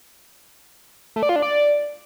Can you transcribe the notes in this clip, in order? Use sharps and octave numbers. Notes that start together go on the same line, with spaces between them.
A3
D5
F4
D4
D5